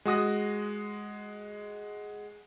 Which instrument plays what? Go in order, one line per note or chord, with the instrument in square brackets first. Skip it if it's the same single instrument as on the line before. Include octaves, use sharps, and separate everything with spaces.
[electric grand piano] G#3 F#4 D#6 A#6